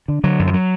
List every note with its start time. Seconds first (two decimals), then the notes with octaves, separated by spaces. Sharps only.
0.08 D3
0.24 D3 F#3
0.39 F#2
0.47 F3
0.54 F#3